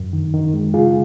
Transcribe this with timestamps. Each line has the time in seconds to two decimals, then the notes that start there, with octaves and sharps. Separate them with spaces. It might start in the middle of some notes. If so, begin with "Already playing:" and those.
Already playing: F#2
0.13 D#3
0.34 D#3
0.54 G#3
0.74 C#3 F4 G#4